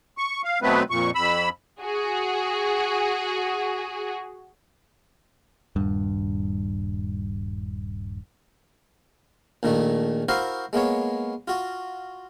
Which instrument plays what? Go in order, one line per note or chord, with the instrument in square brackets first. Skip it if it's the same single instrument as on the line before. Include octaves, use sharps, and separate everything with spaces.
[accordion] C#6
F5
B2 F#3 A3 B3 C4 B4
F2 A#2 C#6
F2 B5 E6
[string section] F#4 G#4
[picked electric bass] D#1 G2
[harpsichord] A#1 A#2 D#3 A3
E4 F#4 A#4 C5 F5
G#3 A#3 B3 C#5
F4 F#4